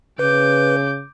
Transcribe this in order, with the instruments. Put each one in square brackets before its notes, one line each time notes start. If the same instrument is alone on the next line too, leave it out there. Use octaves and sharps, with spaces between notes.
[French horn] C#3 [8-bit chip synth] B4 [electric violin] D6 G6